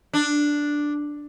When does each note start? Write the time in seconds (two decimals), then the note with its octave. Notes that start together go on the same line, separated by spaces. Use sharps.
0.13 D4